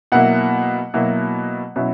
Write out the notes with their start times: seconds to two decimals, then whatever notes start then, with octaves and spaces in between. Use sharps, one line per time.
0.12 B2 F#3 A#3 E4 F#5
0.94 B2 F#3 A#3 E4
1.76 B2 F#3 C#4 E4